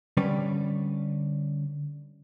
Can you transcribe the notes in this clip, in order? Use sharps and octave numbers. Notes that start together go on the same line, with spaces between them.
D3 G3 C#4 B4 D5